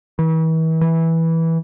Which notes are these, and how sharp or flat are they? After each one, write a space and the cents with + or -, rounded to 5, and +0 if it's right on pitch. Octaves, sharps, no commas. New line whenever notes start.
E3 -40
E3 -10